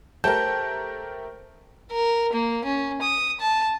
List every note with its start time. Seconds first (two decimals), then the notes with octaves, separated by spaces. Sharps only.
0.24 A3 G4 A#4 C5 G5 A5 G6
1.91 A#4
2.33 A#3
2.65 C#4
3.02 D#6
3.40 A5